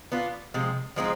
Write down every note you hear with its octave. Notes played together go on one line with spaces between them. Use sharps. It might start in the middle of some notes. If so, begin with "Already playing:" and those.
B3 D4 F4
C3 F3 G#3
F3 G#3 C4 D#4